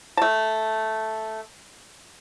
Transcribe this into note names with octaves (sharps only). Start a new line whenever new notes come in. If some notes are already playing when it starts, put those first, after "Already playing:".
A3 A5